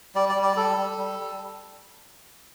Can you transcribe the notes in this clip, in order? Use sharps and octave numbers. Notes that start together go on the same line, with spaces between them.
G3 D5
D5
G3
D5
G3 A4
G3
G3
G3